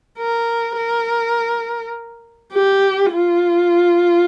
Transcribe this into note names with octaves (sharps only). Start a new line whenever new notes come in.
A#4
A#4
G4
F4